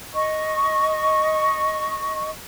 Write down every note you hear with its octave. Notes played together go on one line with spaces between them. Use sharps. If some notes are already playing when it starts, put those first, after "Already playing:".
D#5 C#6